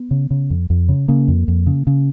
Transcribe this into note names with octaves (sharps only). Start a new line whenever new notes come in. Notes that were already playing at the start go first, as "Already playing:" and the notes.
Already playing: B3
C#3
C#3
F2
F2
C#3
C#3 A#3
F2
F2
C#3
C#3